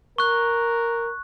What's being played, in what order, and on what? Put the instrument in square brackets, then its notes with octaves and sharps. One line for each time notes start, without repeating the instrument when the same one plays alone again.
[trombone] A#4 [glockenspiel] C#6 F#6